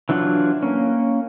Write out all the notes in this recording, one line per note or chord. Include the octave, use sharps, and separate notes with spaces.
E3 F#3 D4 F4 F#5
A#3 C#4